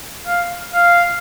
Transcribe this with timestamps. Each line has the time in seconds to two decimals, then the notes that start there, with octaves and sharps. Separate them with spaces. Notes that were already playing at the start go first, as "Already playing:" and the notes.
0.26 F5
0.74 F5